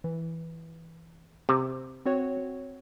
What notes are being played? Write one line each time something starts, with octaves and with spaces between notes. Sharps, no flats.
E3
C3
C4 F#4 C#5